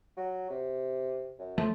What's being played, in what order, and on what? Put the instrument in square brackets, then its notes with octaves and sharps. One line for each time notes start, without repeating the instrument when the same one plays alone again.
[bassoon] F#3
C3
F#2
[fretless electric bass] F3 [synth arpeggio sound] A3